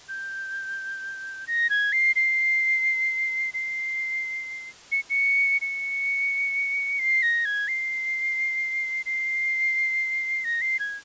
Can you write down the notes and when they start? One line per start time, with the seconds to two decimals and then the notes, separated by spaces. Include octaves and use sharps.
0.08 G6
1.47 A#6
1.70 G#6
1.92 C7
2.16 C7
3.54 C7
4.92 C#7
5.10 C#7
5.61 C#7
6.99 C7
7.22 A#6
7.45 G#6
7.68 C7
9.06 C7
10.44 A#6
10.61 C7
10.79 G#6